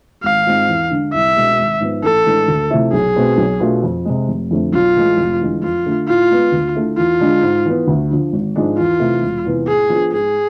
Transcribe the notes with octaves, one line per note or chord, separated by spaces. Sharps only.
G#1 F5
G#2 G#3 C4 F4
E2
D3 G#3 D4
C2 E5
B2 G#3 D4
G#1
G#2 F3 B3
A1 A4
A2 E3 G#3 D4
D2
C3 F3 A3 E4
B1 G#4
B2 A3 C4
B1
B2 A3 D4 F4
F2
C3 G#3
F1
F2 D3 A3 C4
B1 F4
A2 E3 G#3
F1
E2 D3 G#3
F2 F4
D3 A3
A2 F4
G#3 B3
D2
D3 A3 E4
E2 F4
D3 G#3 D4
G#2
E3 B3
D2
D3 F3
G#1
G#2 F3 G#3 D4
E2 F4
C3 E3 A3 E4
E1
E2 C3 E3 B3
A2 G#4
F3 B3 D4 F4
G#2 G#4